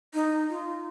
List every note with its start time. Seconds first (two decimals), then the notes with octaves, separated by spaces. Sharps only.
0.14 D#4
0.49 F4